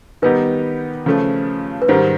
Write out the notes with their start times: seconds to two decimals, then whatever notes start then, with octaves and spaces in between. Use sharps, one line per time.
0.22 D#3 G3 B3 D#4 G4 B4
1.06 C#3 F3 A3
1.82 B4
1.88 G#2 D#3 G3 C5